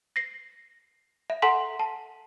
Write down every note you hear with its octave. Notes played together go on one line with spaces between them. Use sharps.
A#6 C7
E5
A4 F#5 G#5 A#5 C6 B6
A5